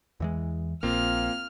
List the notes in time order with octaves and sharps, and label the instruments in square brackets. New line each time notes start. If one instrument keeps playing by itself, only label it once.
[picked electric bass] E2 E3 G#3
[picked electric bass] A#1 [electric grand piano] A#3 C4 F4 [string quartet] F6